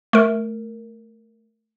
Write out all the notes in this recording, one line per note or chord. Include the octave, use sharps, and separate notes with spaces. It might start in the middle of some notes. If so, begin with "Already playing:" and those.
A3 A#4